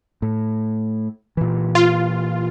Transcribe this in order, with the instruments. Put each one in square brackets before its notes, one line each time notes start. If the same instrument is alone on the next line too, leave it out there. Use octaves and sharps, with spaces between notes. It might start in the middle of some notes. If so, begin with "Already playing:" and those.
[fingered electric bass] A2
A#2 E3
[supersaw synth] F4